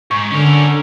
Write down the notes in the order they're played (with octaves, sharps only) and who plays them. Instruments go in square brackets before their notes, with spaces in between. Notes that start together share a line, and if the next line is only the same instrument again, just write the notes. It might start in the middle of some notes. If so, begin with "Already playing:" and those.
[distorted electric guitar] G#2 [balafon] C#6
[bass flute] D3 [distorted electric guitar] C#4 A#4